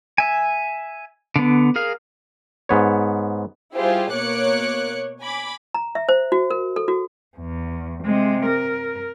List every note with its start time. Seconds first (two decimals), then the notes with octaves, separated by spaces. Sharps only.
0.18 E5 G#5
1.36 D3 B3
1.76 G#4 A#4 F5
2.69 G#2 B3 C#5
3.75 G3 E4 F4 G4 G#4 C5
4.12 B2 A#3 C#5 D6 F#6 C#7
5.21 G#5 B5 D6
5.74 A#5
5.95 E5
6.09 C5
6.32 F#4
6.51 A#4
6.76 A4
6.88 F#4
7.37 E2
8.04 C3 G#3
8.46 A#4